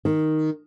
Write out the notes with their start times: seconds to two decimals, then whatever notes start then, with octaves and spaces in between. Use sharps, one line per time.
0.05 D#3